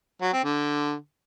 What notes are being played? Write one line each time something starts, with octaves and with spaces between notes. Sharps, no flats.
F#3
C4
D3